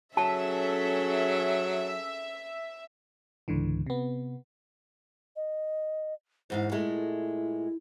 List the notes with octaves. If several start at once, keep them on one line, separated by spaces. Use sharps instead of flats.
F#3 C#4 G#4 A4 E5 A5
C#2 G#2 D3 E3
C3 B3
D#5
E2 G#2 C5 F5
A#2 G#3 A3 E4